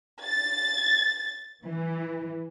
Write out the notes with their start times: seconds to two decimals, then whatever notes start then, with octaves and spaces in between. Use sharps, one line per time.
0.22 A6
1.64 E3